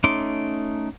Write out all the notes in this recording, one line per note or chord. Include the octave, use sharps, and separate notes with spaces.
A3 C#4 D#4 C6 D6